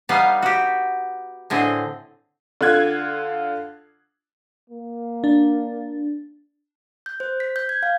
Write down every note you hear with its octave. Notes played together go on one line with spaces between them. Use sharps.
G3 B3 D#4 F5
F#4 G4
A2 D3 C4 G#4 D#5
D3 F4 F#6 G#6
A#3
D4
G6
C5
B6
G6
G#6
F5